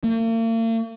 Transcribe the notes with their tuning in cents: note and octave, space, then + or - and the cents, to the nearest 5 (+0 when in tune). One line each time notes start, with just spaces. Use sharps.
A#3 -45